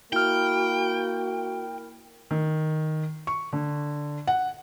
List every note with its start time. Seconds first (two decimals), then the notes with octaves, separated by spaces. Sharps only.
0.13 A#3 E4 F#4 G5 F6
2.31 D#3
3.27 C#6
3.53 D3
4.27 F#5